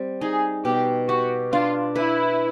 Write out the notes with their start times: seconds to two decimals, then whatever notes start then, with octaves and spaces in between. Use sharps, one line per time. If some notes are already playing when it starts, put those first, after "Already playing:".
Already playing: G3 C4
0.21 D#4 G#4
0.65 B2 G4
1.08 F#4 G4
1.52 D4 F4
1.95 E4 B4